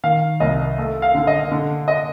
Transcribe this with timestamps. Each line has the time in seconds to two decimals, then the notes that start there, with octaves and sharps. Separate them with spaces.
0.04 D#3 F5
0.40 C2 D#5
0.78 A3
1.02 F5
1.15 D3
1.27 D#5
1.52 D3
1.88 D#5